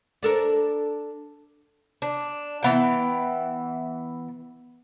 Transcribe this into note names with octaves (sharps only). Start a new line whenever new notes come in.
D4 A4 A#4
D4
E3 B3 G5